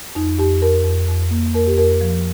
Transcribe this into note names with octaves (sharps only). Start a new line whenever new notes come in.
F2 D#4
F2 G4
F2 A#4
F2
F2
A#3
F2 A#4
G4
F2 A#4
F3